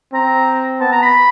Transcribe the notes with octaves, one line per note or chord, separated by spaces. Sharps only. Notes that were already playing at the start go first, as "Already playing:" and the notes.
C4 A#5
B3 A5
A#5
B5